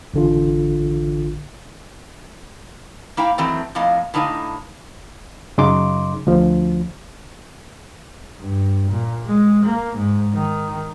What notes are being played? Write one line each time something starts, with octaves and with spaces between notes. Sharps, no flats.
A1 D3 F4
A#3 E4 F5 G5 A#5
D#3 E3 F#3 A3 C4
F2 A2 A#3 D#5 F5
A2 D3 D#4 D#5 F5 G#5
F#2 C#3 D#4 C6 D6
D2 F3
G2
A#2
G#3
A#3
G#2
D#3